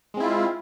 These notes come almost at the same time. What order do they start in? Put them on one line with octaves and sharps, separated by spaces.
G#3 C4 E4 F4